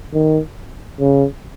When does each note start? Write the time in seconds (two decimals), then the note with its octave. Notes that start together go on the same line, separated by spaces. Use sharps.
0.14 D#3
1.00 C#3